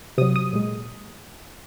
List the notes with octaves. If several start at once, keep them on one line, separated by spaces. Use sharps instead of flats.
C3 F#3 D#6
D#6
A#2 G#3